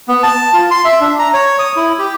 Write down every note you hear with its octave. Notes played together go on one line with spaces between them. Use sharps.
B3
A5
F4
C6
E5
D4
A#5
C#5
D#6
E4
G4